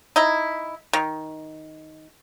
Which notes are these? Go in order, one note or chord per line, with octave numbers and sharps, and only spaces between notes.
D#4 E4
D#3